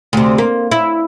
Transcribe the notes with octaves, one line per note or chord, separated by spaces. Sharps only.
D2 C3
A#3
E4